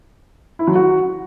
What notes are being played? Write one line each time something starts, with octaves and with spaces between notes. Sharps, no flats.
E4
F#3
F#4